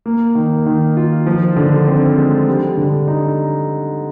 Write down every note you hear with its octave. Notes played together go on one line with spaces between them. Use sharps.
A#3
D#3
D#3
F4
F3
D3
C4
G#3
G3
D3
D#4